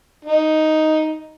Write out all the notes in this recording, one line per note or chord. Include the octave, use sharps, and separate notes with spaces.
D#4